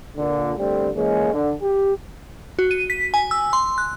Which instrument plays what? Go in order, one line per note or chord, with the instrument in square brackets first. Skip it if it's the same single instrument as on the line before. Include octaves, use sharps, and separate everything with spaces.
[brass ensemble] A#2 D3
D3 G3 A3 C4
E3 G#3 A#3 C#4
D3
G4
[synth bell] F#4
D#7
B6
G#5
E6
C6
F#6